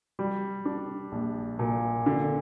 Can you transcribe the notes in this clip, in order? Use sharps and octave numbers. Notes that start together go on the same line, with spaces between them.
G3
D4
A#1
A#2
D3